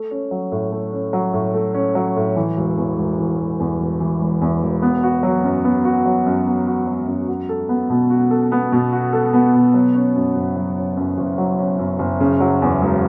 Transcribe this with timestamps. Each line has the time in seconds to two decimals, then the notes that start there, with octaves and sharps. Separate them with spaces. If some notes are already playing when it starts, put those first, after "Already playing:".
Already playing: A3
0.11 C#4
0.31 F#3
0.52 A2
0.72 A3
0.93 C#4
1.13 F#3
1.33 A2
1.54 A3
1.74 C#4
1.95 F#3
2.16 A2
2.36 E3
2.57 E1
2.78 E2
2.98 E1
3.19 E3
3.39 E1
3.60 E2
3.80 E1
4.00 E3
4.21 E1
4.41 E2
4.62 E1
4.82 B3
5.03 F#4
5.23 F#3
5.44 F#2
5.65 B3
5.85 F#4
6.05 F#3
6.26 F#2
6.47 B3
6.67 F#4
6.87 F#3
7.07 F#2
7.28 F#4
7.49 A4
7.69 B3
7.90 B2
8.10 F#4
8.31 A4
8.52 B3
8.72 B2
8.92 F#4
9.13 A4
9.34 B3
9.54 B2
9.74 F#3
9.95 C#4
10.16 F#2
10.35 F#1
10.56 F#3
10.76 C#4
10.97 F#2
11.18 F#1
11.38 F#3
11.59 C#4
11.79 F#2
11.99 F#1
12.20 C#3
12.40 F#3
12.62 E2
12.82 E1